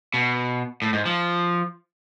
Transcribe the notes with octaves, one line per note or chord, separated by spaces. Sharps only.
B2
A2
G#2
F3